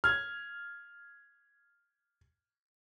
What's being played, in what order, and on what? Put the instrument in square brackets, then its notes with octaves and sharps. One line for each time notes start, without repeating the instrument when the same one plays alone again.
[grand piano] F6 G#6